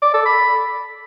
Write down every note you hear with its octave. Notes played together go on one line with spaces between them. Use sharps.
D5
A4
B5